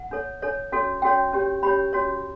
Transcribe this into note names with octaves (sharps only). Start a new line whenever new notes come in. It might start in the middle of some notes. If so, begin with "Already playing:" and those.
Already playing: F#5
D4 A4 C#5
D4 A4 C#5
C#4 F#4 A4 C#5
C#4 F#4 A4 C#5 G5
C#4 G4 C#5
C#4 G4 C#5 B5
C#4 F#4 C#5